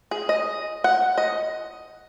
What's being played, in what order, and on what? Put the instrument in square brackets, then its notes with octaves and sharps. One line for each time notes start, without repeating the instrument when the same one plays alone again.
[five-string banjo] G#4
D#5
F#5
D#5